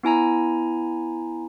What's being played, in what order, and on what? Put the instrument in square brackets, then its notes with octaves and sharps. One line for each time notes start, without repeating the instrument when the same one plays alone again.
[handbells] B3 E4 G#5 A#5